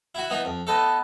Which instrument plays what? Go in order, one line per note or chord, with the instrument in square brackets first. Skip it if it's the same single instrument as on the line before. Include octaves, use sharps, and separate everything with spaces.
[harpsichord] E4 F#4
E3 B3 D#4
F2
[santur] A3 B3 [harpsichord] A4 D#5